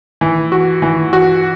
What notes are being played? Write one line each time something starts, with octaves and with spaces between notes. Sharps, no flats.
E3
F#4
E3
F#4